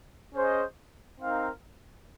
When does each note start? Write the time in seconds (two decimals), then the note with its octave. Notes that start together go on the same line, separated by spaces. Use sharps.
0.34 C#4 G#4 C5 D#5
1.19 C4 D#4 A#4 F5